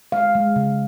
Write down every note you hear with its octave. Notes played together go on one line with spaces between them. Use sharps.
G#3 F5
G#3
C#3